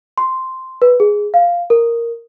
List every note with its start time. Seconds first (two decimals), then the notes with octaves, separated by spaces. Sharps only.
0.18 C6
0.82 B4
1.00 G#4
1.34 F5
1.70 A#4